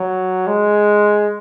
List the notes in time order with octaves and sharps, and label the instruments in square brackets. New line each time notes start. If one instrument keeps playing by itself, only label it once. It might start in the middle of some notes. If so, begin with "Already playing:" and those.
Already playing: [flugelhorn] F#3
G#3